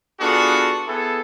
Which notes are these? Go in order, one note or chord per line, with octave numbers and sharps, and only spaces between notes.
B3 D4 F4 F#4 G#4 A4
B3 E4 G#4 A4